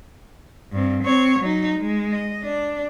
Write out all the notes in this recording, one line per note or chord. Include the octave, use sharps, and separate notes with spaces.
G2 C4
C4 C#5
F#3 D#4
G#3
D#5
D4